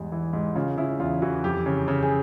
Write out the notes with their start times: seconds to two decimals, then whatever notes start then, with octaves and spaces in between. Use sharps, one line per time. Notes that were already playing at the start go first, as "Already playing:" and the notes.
Already playing: E2 G#2 G3
0.12 E3
0.33 G#2
0.56 C#3 F4
0.77 C#3 E4
0.99 E2 F4
1.22 E3 F#4
1.44 F2 G4
1.66 C#3
1.88 C#3
2.03 G#4